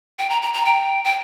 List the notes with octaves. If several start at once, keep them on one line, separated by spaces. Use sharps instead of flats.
G5
A#5
A#5
A#5
G5
G5